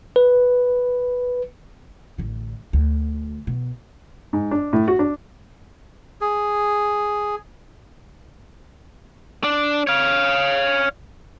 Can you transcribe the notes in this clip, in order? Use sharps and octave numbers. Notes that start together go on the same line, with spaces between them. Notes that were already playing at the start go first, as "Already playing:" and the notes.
B4
A1 D3
D2
B2
G#2
D4
A2
F#4
D4
G#4
D4
C#5 F5